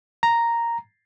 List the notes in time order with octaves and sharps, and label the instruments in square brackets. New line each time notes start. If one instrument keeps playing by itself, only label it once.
[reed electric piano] A#5